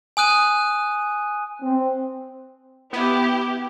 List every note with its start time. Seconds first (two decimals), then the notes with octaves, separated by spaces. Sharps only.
0.17 G#5 D#6 F#6 D#7
1.62 C4
2.93 B3 E4 G4